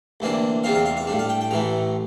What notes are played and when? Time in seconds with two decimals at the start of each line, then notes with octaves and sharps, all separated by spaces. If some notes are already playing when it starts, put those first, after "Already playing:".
0.20 D2 C3 E3 A#3 D4
0.64 E2 C3 G3 C4 F4 F5
0.75 F5
0.85 F5
0.97 F5
1.07 A2 G3 D4
1.19 F5
1.29 G5
1.41 G5
1.51 A1 A2 E3 A3 A#5